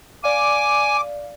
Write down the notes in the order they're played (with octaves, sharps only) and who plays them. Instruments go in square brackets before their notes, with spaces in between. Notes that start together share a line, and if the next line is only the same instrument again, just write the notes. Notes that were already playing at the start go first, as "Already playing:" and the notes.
[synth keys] D5 F5 [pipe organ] G#5 [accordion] D6